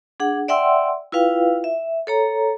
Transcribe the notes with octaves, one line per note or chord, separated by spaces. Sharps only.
D4 G#4 F#5
D5 E5 F#5 G5 C6 E6
E4 F4 B4 F5 G5
E5
A4 C#5 A#5